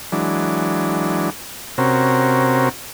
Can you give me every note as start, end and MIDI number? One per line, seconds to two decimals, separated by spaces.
0.12 1.30 52
0.12 1.30 54
0.12 1.30 56
0.12 1.30 62
1.78 2.69 48
1.78 2.69 60
1.78 2.69 61
1.78 2.69 66
1.78 2.69 70